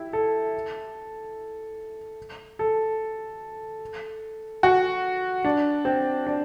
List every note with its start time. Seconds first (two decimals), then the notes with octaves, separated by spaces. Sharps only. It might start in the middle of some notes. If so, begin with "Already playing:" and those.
Already playing: E4 G4
0.13 A4
2.59 A4
4.63 F#4
5.45 D4
5.85 C4
6.26 D4